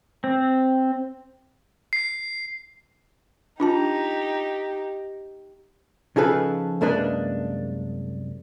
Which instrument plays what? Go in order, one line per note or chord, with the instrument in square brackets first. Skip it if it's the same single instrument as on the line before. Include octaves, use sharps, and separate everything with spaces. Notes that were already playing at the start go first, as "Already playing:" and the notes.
[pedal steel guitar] C4
[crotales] C7
[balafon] D4 F4 A5 [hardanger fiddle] D#4 G4
[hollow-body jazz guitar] C#3 F3 D#4 G#4 A4 B4
C2 F#2 G#3 A#3 D4 B4